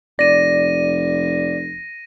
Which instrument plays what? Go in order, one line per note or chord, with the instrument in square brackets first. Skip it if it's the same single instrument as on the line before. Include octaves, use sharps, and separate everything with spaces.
[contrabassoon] F1 [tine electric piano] D5 [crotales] A#6 D#7